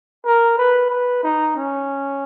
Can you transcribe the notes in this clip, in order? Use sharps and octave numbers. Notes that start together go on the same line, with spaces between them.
A#4
B4
B4
D#4
C#4